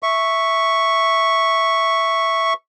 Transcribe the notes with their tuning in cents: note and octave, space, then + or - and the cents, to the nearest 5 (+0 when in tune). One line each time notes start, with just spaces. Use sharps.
E5 +0 C#6 +0